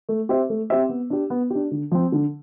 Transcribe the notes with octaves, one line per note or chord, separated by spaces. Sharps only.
A3
C4 G4 C5 E5
A3
C4 G4 C5 E5
B3
D4 G4
B3
D4 G4
D3
F3 C4
D3